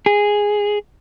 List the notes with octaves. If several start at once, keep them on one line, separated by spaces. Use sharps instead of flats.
G#4